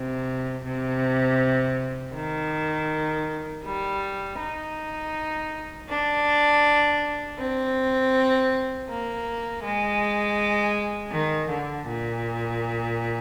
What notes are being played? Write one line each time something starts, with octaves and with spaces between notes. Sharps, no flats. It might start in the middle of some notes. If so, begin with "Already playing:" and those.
Already playing: C3
C3
D#3
G3
D#4
D4
C4
A#3
G#3
D#3
D3
A#2